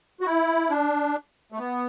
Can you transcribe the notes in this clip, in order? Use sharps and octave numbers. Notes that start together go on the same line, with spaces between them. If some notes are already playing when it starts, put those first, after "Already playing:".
F#4
E4
D4
A3
B3